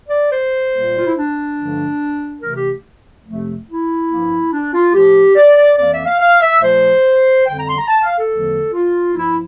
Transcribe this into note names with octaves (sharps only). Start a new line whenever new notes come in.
D5
C5
A#2 G3 A#3
F4
E4
D4
G2 D3 F3 A3
C3 E3 A3 A#4
G4
F2 C3 F3 A3
E4
G2 F3 A#3
D4
F4
A2 F3 A3 G4
D5
F2 E3 A#3 D5
E5
F5
F5
E5
A#2 F3 A3 C5
F2 D3 G3 G5
A#5
C6
A#5
A5
F5
A4
E2 D3 F3 A3
F4
G2 F3 A#3 E4